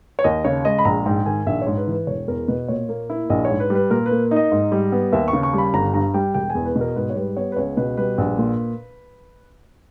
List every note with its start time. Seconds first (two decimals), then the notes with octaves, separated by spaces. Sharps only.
0.19 C#5
0.24 D#2 D#5
0.45 C#3 C#5
0.65 G#3 D#5
0.79 B5
0.85 A#1 A#5
1.06 G#2 G5
1.26 D#3 G#5
1.46 A#1 E5
1.62 C#5
1.67 G#2
1.77 B4
1.87 E3
1.92 B4
2.07 E1 C#5
2.28 E2 A#4
2.48 B2 B4
2.68 A#2 C#5
2.89 A#3
3.10 E4
3.30 A#1 D#5
3.45 C#5
3.50 G#2
3.60 B4
3.70 G3
3.75 B4
3.90 A#2 A#4
4.06 B4
4.11 A#3
4.31 D#4
4.36 D#5
4.52 G#2
4.72 G3
4.92 B3
5.12 D#2 E5
5.28 C#6
5.33 C#3
5.43 C#6
5.53 G3 B5
5.74 G1 A#5
5.94 G2 A#5
6.14 G3 G5
6.34 E1 G5
6.50 G#5
6.55 E2
6.65 B4
6.75 B2
6.81 A#4
6.96 G#2 B4
7.10 C#5
7.16 G3 B4
7.37 B3 C#5
7.52 B4
7.56 C#2 C#5
7.77 B2 B4
7.97 G3 B4
8.18 A#1
8.38 A#2